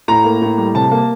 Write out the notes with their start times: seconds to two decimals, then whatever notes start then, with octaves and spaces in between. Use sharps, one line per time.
0.08 A2 A#5
0.25 A#3
0.42 A2
0.58 G3
0.75 C3 A5
0.91 A#3